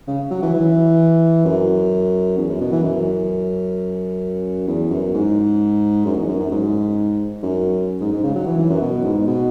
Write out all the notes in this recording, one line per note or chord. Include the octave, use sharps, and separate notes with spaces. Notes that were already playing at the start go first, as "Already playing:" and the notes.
C#3
F#3
E3
E3
F#2
E2
F#2
B2
E3
F#2
E2
F#2
G#2
F#2
E2
F#2
F#2
G#2
F#2
G#2
G#2
C#3
F#3
E3
E3
F#2
B2
G#2
B2